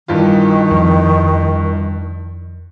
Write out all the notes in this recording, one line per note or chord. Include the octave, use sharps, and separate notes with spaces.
G2 D#3 E3 F4
F2 F3